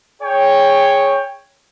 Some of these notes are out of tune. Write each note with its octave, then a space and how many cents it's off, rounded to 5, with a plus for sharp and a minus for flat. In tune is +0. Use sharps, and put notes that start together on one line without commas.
G#4 +0 C#5 +0 G5 +15